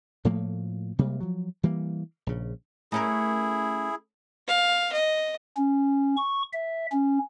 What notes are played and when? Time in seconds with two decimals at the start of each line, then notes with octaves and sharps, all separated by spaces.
0.25 A2 F3 A3 A#3
0.99 C3 G3 G#3 A#3
1.21 F3 F#3
1.63 E3 G3 A#3
2.27 A#1 C#3
2.92 A3 C#4 E4 G#4 A#4
4.48 F5
4.93 D#5
5.57 C#4
6.17 C#6
6.53 E5
6.92 C#4